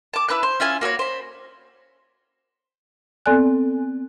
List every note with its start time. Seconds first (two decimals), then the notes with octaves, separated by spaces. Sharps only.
0.14 A5 D6
0.28 E4 B4 A5 F#6
0.43 C5
0.60 C#4 E4 F4 G#5
0.81 A#3 F#4 A4 C#5
0.99 C5 B5
3.26 B3 C4 A4 D5 G#5 F#6